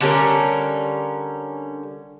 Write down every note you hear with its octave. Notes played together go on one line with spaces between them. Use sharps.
D3 G3 C#4 A#4